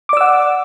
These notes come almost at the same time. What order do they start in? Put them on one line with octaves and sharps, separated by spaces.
D6 D5 E6 F#5